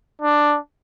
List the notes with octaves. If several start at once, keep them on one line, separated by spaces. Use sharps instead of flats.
D4